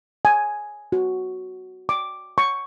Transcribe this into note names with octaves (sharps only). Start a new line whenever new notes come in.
G#5
F#4
D6
C#6